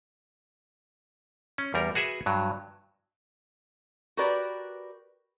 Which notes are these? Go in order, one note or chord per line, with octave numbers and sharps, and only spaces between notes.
C#4
E2 G3 A#4
F#4 G#4 B4 E5 F#5
G2 F#3
F#4 G4 A#4 B4 D5